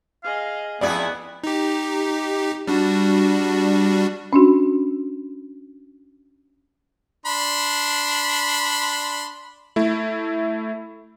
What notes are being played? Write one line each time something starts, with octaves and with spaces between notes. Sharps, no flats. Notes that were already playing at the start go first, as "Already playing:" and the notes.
G#4 D#5 F5
F2 B3 E4 G#4 D5 F#5
D#4 G4
G3 D4 F#4
C#4 D4 F#4
D4 B5 C6
A3 E4